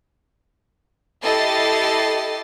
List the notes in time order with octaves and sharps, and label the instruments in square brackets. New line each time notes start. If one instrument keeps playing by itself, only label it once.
[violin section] E4 G4 A4 D#5 A6 C7